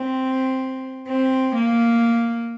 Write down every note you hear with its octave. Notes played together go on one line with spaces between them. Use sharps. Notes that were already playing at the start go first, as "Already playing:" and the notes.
Already playing: C4
C4
A#3